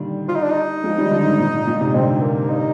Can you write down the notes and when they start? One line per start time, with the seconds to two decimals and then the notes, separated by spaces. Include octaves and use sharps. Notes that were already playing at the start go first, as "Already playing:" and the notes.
Already playing: A#2 D3 D#3 G3
0.28 F4
0.36 D#4
0.43 D4
0.50 D#4
0.84 F3 G#3
0.98 D#3 G3
1.11 D3 F3
1.25 G#2
1.39 A#2
1.53 G#2
1.67 A#2
1.81 G#2 C3
1.94 A#2 D3 C4
2.22 A#3
2.50 D#4